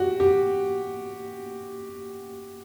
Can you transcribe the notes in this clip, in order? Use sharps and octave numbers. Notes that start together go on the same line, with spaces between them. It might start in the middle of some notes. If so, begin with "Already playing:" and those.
Already playing: F#4 G4
G4